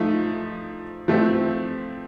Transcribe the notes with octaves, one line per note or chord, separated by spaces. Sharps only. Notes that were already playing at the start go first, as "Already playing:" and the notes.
Already playing: F3 A3 D#4
F3 A3 C4